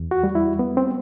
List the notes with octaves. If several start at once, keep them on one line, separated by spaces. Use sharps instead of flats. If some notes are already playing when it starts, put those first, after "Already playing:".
Already playing: E2
F#4
G3
E4
B3
C4